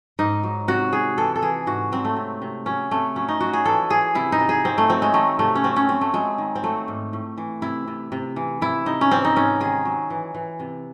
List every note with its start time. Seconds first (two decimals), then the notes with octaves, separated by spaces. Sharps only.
0.19 G#2 D#4
0.43 F#3
0.68 C3 F#4
0.93 C3 G#4
1.18 E3 A4
1.36 A4
1.42 E3 G#4
1.67 G#2 F#4
1.92 F#3 C4
2.05 A3
2.16 C3
2.42 C3
2.66 F#3 C#4
2.91 C3 A3
3.16 F#3 C#4
3.29 D#4
3.40 F#3 F#4
3.53 G#4
3.65 E3 A4
3.90 E3 G#4
4.15 C3 E4
4.32 D#4
4.40 C3
4.49 G#4
4.64 F#3 C4
4.78 A3
4.90 F#3 C4
5.02 G#3
5.14 D#3 A3
5.39 C3 A3
5.55 C#4
5.64 F#3 C4
5.76 C#4
5.89 F#3 C4
6.01 A3
6.13 F#3 G#3
6.38 D#3
6.55 C4
6.64 F#3 A3
6.88 G#2
7.13 A2
7.38 E3
7.62 C3 E4
7.88 C3
8.12 C3
8.36 E3
8.61 C3 E4
8.86 C3 D#4
9.01 C#4
9.11 E3 C4
9.25 D#4
9.36 G#2 C#4
9.60 D#3 G#4
9.85 F#3
10.10 E3
10.34 E3
10.60 C3